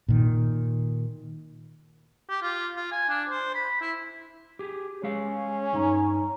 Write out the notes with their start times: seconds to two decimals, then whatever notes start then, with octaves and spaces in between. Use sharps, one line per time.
0.09 A#2 D#3
2.29 G4
2.42 F4
2.76 F4
2.92 G#5
3.09 D4
3.29 C5
3.55 B5
3.81 E4
4.59 G4 G#4
5.03 G#3 C#4 G#4 F5
5.73 E2 G2 D#4 A#5